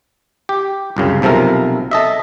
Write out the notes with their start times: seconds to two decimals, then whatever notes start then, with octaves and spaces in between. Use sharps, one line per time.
0.49 G4
0.97 C2 F#2 C#3
1.22 B1 C3 F3 A4 A#4
1.91 A4 D#5 E5